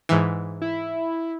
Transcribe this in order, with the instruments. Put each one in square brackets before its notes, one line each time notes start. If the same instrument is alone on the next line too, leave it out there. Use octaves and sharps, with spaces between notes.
[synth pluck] G#2 E3
[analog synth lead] E4